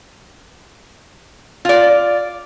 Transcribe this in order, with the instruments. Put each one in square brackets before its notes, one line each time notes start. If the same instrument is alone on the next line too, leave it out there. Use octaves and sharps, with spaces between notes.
[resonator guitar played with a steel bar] F4 D5